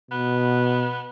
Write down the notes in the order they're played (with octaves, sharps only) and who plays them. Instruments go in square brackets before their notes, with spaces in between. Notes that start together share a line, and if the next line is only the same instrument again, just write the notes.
[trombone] B2 [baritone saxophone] B3